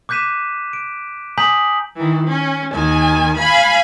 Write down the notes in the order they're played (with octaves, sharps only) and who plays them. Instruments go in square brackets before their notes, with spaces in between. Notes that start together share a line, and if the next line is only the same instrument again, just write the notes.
[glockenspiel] D6 F#6 G6 B6 D#7 E7
D7
G#5 A#5 D#6 G6 B6 F#7
[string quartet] D#3 E3
C#4
D#2 D#3 G#5
F5 G#5 B5